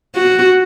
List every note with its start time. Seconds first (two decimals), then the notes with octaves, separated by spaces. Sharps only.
0.15 F#4